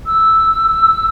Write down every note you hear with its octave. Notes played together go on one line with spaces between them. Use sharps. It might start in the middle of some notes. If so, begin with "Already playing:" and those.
E6